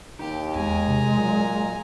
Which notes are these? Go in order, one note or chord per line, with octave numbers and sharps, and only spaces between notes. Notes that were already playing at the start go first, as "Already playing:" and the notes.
D#2 D#4 G4
E2 G#3 G#5 A#5
C3
A#2 F#3